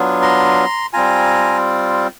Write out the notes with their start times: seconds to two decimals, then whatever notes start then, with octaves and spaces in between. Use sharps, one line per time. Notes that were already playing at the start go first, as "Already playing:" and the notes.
Already playing: F#3 B3 D4 F4
0.22 A#5 C6
0.93 G3 C4 F4 G#5 A#5